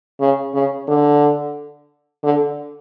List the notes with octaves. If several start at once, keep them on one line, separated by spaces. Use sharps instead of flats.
C#3
C#3
D3
D3